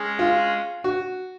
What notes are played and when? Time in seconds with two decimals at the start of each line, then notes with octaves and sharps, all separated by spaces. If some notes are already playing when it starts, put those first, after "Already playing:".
Already playing: G#3 C#4 G#4
0.19 F4
0.84 F#4